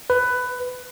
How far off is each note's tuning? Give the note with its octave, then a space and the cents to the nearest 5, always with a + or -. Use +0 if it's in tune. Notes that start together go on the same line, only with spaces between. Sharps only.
B4 +15